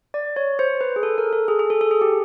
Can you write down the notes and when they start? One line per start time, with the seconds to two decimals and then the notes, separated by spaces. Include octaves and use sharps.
0.14 D5
0.36 C#5
0.59 C5
0.81 B4
0.96 G#4
1.03 A4
1.18 A#4
1.33 A4
1.48 G#4
1.59 G#4
1.70 A4
1.81 A4
1.91 G#4
2.01 G4